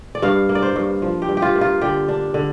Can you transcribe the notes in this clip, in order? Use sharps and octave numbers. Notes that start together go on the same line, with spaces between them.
D5
G2 F5
A#3
D5
C5
G2
F3
G4
G2
G4
F4
A#3
F4
D3 G4
D4
D3